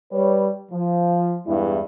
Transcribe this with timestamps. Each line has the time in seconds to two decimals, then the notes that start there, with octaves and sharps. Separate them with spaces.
0.12 G3 B4 C#5
0.71 F3
1.46 E2 G2 G#3 E4